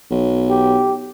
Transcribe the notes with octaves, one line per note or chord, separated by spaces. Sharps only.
B1
G4